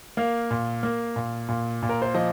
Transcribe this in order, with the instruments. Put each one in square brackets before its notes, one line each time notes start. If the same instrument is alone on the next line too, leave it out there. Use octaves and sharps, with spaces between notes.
[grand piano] A#3 F5
A#2
A#3
A#2
A#2
A#2
A#4
C5
F3 D#5